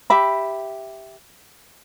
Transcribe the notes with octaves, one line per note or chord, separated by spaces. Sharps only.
G4 E5 B5